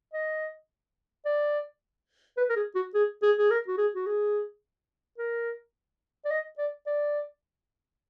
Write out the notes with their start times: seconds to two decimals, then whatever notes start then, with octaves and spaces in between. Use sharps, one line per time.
0.14 D#5
1.26 D5
2.38 B4
2.49 A#4
2.56 G#4
2.75 F#4
2.95 G#4
3.23 G#4
3.38 G#4
3.50 A#4
3.68 F#4
3.78 G#4
3.95 F#4
4.07 G#4
5.18 A#4
6.25 D5
6.31 D#5
6.58 D5
6.86 D5